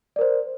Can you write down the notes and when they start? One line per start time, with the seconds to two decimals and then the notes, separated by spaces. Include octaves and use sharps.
0.16 D5
0.19 A#4
0.21 C5